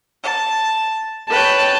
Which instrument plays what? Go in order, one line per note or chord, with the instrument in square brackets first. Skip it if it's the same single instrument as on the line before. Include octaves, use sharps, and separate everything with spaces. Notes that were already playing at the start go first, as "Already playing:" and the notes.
[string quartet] A5
[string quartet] B4 C#5 G5 [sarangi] A5